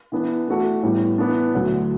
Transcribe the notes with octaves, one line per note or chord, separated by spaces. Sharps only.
E3 B3 D4
E3 A3 D4 F#4 A4
A2 E3 G3 B3
E3 B3 D4
D2 D3 F#3